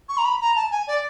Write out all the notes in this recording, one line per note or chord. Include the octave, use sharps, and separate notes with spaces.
C#6
A#5
B5
A#5
A5
G#5
D5